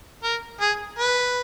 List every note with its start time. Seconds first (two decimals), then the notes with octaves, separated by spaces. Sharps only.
0.23 A#4
0.61 G#4
0.98 B4